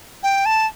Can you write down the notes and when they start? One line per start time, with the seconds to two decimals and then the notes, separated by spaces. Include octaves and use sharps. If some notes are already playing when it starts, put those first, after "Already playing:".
0.23 G5
0.46 A5